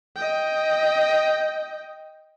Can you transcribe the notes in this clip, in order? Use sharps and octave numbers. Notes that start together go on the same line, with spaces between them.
D#5 G5